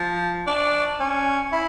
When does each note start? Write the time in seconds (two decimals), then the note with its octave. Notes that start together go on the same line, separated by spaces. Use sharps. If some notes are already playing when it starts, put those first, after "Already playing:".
Already playing: F3
0.47 D4
1.00 C#4
1.53 E4